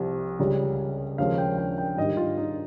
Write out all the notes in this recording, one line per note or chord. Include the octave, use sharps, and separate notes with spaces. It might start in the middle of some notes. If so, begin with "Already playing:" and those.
Already playing: C2 C3 F3
C#2 C#3 G3
D#2 C#3 F3 G#3 F5
G5
G5
G5
G#2 D#3 G3 D#5
F4
D#4